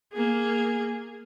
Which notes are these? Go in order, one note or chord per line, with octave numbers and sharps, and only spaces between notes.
A#3 G#4